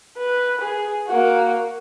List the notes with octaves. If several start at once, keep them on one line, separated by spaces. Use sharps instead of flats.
B4
G#4
A#3 F#4